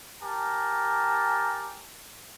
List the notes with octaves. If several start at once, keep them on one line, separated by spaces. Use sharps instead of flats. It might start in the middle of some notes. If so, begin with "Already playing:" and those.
G4 A#4 G#5 A5